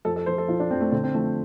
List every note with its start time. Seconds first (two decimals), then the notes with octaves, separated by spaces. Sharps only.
0.05 F2 A4
0.16 A4
0.26 F3 C5
0.38 A4
0.48 F3 F4
0.60 D4
0.71 F2 C4
0.81 A3
0.92 D3 C4
1.03 C4
1.14 F3 A3